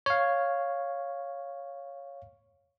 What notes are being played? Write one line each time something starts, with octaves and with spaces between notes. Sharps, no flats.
C#5 F5